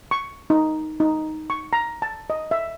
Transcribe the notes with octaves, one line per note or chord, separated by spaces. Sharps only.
C#6
D#4
D#4
C#6
A#5
A5
D#5
E5